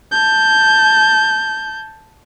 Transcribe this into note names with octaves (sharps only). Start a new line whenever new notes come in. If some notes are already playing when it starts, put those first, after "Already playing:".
A5 G6